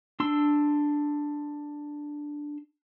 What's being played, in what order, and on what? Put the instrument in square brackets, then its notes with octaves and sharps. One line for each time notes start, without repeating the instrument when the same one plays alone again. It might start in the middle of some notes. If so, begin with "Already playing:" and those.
[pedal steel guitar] D4 C6 E6